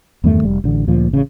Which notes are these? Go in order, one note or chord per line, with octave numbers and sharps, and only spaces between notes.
E2 G2 D#3 A3
F1 G3
A1 D3
D2 A#2 F3
A1 C#3